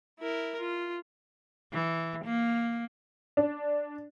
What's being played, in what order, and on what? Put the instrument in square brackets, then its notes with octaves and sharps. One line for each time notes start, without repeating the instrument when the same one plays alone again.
[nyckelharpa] E4 A#4
F4
[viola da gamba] E3
A#3
[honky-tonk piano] D4